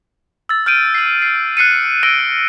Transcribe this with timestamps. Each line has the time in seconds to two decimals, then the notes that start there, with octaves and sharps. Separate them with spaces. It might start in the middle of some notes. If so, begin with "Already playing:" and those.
0.49 E6 A6
0.66 F6 G6 D7 D#7
0.95 C7 F#7
1.22 C7
1.57 F#6 C7 C#7 D#7
2.03 E6 F#6 A#6 D7 D#7 G7